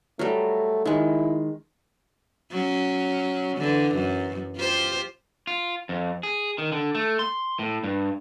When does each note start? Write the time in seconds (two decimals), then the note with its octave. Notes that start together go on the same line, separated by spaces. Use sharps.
0.19 F#3 G3 A3
0.85 D#3 G#3 E4
2.52 F#3 C#4
3.57 D3 E3
3.95 F#2
4.56 F4 G4 C5
5.47 F4
5.89 F2
6.23 G#4
6.58 D#3
6.72 D3
6.95 A3
7.19 C6
7.59 A2
7.84 G2